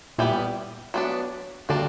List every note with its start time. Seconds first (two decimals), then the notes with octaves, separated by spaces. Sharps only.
0.18 A#2 E3 G3 B3
0.94 F#3 B3 D4
1.69 D3 G3 A#3 D4 F#4